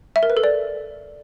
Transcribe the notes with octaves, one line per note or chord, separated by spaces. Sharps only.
E5
A#4
B4
A4
D5